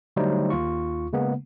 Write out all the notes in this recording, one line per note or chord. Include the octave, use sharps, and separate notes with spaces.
D3 F#3 G3 A3 D#4 C5
D#2 F4 C#6
C#3 G#3 A#3 B3